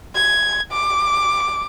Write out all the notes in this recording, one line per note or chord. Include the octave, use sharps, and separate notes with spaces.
G#6
D6